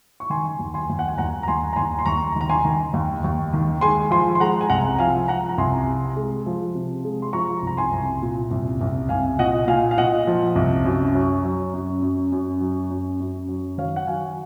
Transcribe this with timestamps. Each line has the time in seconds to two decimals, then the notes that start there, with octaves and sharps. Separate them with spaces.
0.20 C#6
0.30 D#3 G#5 C6
0.59 D#2
0.74 G#5 C6
0.89 D#2
0.99 F#5
1.08 G#5
1.18 D#2 F#5 A#5
1.43 A#5
1.48 D#2 G#5 C6
1.73 A#5
1.76 D#2 G#5 C6
1.99 C6
2.06 D#2 A#5 C#6
2.36 D#3 A#5
2.50 G#5 C6
2.64 D#3
2.93 D#2
3.24 D#2
3.53 D#3
3.81 G#3 G#5 C6
4.11 F3 G#5 C6
4.35 C6
4.40 G#3 F#5 A#5
4.61 G#5
4.70 C2 F#5 A#5
4.99 F3 F5 G#5
5.28 F3 F#5 A#5
5.49 A#5
5.58 C2 G#5 C6
5.87 C3
6.16 G#3
6.46 F3
6.75 C3
7.04 G#3
7.22 C6
7.33 F3 A#5 C#6
7.62 C2 A#5
7.77 G#5 C6
7.92 C2
8.22 A#2
8.51 C2
8.81 C2
9.09 C2 F5 G#5
9.39 A#2 D#5 F#5
9.67 A#2 F5 G#5
9.91 F5
9.98 A#2 D#5 F#5
10.27 F3
10.56 C2
10.85 F#2
11.15 F#3
11.44 F#3
11.73 F#2
12.02 F#2
12.32 F#2
12.60 F#3
12.90 F#2
13.20 F#2
13.48 F#3
13.78 D#3 C#5 F5
13.96 F#5
14.07 F#3 F5 G#5